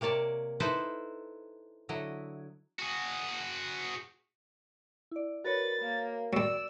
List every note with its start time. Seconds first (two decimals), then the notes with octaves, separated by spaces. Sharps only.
0.01 C3 A#3 C#5 D5 A5
0.60 D#4 E4 A4 B4 C5
1.89 D3 F#3 E4 D#5
2.79 F#4 G#4
5.11 E4 D5
5.44 F#4 A#4 B4 C#5 A6
5.81 A#3
6.33 F#3 G3 D5 E6